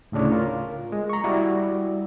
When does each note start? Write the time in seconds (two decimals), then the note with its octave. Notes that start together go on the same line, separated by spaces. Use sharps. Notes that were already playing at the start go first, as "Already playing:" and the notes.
0.12 D2 A2 C#3 D4 C#5
0.31 F4 A#4
0.92 G#3
1.10 A#5 C#6
1.24 G3 E4 F#4 D5 E5